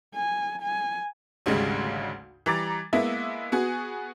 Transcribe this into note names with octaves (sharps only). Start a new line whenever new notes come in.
G#5
G#5
G#1 D2 C#3 G3 G#3
E3 G3 A#5 D6 A6
G#3 A#3 B3 E4 E5
B3 F#4 G#4